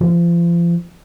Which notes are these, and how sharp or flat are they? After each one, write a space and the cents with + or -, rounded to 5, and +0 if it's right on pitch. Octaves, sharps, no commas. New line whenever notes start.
F3 -35